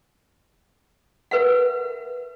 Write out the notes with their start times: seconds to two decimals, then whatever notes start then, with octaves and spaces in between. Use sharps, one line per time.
1.31 A#4 B4 E5 F#5